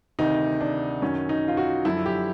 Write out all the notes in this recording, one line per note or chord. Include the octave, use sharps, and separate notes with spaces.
D2 C3 D#3 D#4
D4
F#2 D#3 F#3 C#4
D#4
F4
F#4
F#2 D3 F3 E4
G4